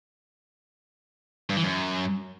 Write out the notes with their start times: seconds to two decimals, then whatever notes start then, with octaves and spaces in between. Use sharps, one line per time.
1.50 G2
1.57 E3
1.64 F#2